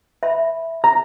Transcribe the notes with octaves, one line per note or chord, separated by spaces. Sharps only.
E5 B5
A#5